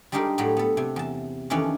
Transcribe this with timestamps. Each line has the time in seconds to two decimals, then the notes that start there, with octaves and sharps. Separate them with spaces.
0.12 G3 G#3 D4 D#4 G4 A#4
0.38 A2 F#3 G3
0.57 B3 A4
0.77 C3
0.96 E2 A5
1.50 F2 D#3 E3 C#4 D4